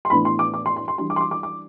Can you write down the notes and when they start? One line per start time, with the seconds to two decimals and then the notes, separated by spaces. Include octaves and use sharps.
0.05 C6
0.10 A2 E3 B3 D4 B5
0.25 C6
0.39 D6
0.54 D6
0.66 C6
0.76 C6
0.88 C6
0.98 E3 G3 D4 C6
1.10 D6
1.16 C6
1.21 D6
1.31 D6
1.43 D6